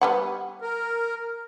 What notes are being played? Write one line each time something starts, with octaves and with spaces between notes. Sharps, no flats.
G3 B3 F#5
A#4